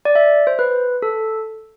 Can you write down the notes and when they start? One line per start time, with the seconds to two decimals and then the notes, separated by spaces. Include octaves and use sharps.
0.05 D5
0.15 E5
0.47 C5
0.59 B4
1.02 A4